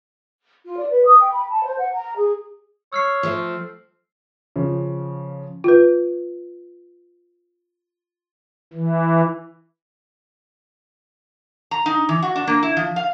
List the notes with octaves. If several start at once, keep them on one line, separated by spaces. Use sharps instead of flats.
F4
D5
B4
D#6
G5
B5
A5
C5
F#5
A#5
G#4
C#5 E6 F6 C7
F3 A3 C4
C#3 F3
F4 B4
E3
A#5
D#4
E3
F#4
D4
A#3
E4
F3
F5